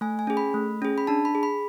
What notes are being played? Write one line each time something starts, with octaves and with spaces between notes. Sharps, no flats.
A3 G#5
G#5
C#4 G#4
B5
A3
C#4 G#4
B5
D4 A5
B5
G#4
B5